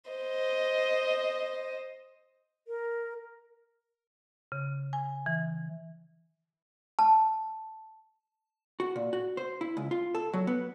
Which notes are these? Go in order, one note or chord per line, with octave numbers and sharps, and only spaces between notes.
C5 D#5
A#4
C#3
G#5
E3
A5
F#4
A#2
F#4
C5
E4
C#2
F4
A4
F#3
B3